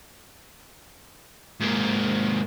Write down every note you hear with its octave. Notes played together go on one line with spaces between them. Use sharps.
G#2 A#3